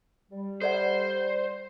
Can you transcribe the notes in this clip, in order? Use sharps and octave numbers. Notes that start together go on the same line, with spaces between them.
G3
A4 C5 D5 F#5